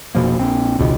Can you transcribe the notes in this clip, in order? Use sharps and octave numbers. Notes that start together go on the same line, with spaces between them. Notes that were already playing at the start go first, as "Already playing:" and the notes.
F1 B2 F3 A#3
A#1 C4
E1 C#2 B2 D#3